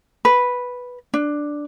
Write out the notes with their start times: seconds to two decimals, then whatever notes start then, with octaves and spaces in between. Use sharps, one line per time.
0.25 B4
1.14 D4